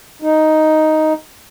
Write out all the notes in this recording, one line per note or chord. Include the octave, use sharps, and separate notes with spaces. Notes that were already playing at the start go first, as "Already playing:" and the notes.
D#4